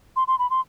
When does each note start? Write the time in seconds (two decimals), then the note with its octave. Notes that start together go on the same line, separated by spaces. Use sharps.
0.16 C6
0.28 C6
0.39 B5
0.50 C6